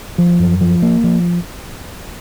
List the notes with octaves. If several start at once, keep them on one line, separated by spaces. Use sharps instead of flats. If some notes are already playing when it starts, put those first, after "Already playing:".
F3
F#2
F3
A#3
F3